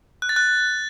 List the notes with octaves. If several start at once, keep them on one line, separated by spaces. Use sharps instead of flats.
F#6
A6
F#6